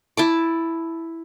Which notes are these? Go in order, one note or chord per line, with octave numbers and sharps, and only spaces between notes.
E4 A5 D6